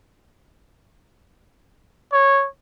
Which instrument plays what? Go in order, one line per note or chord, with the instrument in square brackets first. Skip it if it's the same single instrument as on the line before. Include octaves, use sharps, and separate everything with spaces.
[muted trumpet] C#5